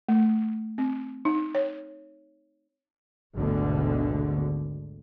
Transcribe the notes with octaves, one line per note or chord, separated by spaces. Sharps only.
A3
C4
D#4
C#5
G#1 D2 B2 D3